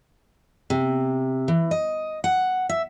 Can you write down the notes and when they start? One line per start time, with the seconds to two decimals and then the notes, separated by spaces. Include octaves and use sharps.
0.70 C3
1.48 E3
1.71 D#5
2.24 F#5
2.69 E5